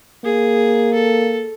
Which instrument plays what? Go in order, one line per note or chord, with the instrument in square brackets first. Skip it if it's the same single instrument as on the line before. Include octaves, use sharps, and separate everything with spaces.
[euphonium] A#3 [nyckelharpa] G#4
[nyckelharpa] A4